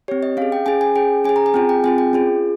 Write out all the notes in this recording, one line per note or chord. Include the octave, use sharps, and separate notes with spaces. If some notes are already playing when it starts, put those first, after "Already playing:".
C4 G4 C#5
D#5
C#4 G#4 F5
G5
C#4 G#4 G#5
G#5
C#4 G#4 G5
C#4 G#4 G#5
A#5
G#5
C4 F4 G#4 G5
G5
C4 F4 G#4 G#5
G5
C#4 F4 G#4